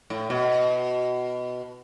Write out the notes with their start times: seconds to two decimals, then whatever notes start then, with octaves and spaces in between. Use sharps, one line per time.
0.10 A2
0.30 B2